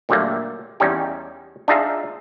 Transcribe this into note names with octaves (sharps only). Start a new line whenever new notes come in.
A#2 D3 F#3 G3 A3 A#3
E2 G3 C#4 D#4 G4
D4 D#4 F4 G#4 E5 F5